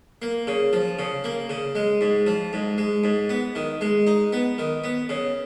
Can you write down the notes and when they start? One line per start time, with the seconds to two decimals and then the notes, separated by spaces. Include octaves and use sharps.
0.22 A#3
0.47 C#3
0.73 F3
0.99 C#3
1.24 A#3
1.50 C#3
1.75 G#3
2.01 G#2
2.27 F3
2.53 G#2
2.78 G#3
3.04 G#2
3.29 B3
3.55 D#3
3.81 G#3
4.07 D#4
4.33 B3
4.58 D#3
4.84 B3
5.09 C#3